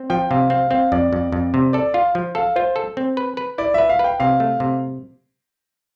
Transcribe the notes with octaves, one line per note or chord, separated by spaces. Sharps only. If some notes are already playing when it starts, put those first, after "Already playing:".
Already playing: C4
F3 G5
C3 F5
C4 F5
C4 F5
F2 D5
F2
F2
C3
A4 D5
F4 F5
F3
A4 F5
F4 C5
A4
C4
B4
B4
E4 D5
B4 E5
F5
B4 G5
C3 F5
A3
C3